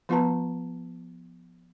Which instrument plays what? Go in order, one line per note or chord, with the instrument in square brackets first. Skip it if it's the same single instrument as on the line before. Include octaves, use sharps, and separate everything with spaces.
[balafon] F3 B3 F4 B4 A5 A#5